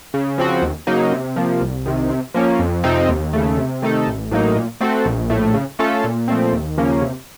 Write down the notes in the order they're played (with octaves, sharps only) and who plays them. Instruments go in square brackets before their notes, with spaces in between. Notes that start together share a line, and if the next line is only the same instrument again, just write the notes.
[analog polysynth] C#3
F3 C4 F#4
D#2
C#3 F#3 A#3 D#4
C3
F3 A#3
C2
C3 D#3
C3
F3 A#3 C#4
F2
C3 F3 C4 D#4
D#2
C#3 A3
C3
D#3 A3 D#4 A4
A1
A2 F#3 A#3 D#4
A#2
A3 C4 F#4 A4
A#1
A2 A3
C#3
A3 C#4 F4 A4
A#2
F3 A3 C4
D#2
C#3 F3 A#3 C#4
C3